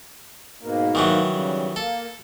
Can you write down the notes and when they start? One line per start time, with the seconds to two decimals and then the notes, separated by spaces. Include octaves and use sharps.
0.61 G#2 B2 A#3
0.95 D#3 E3 F#3
1.29 C#3 G3
1.76 A#3 A4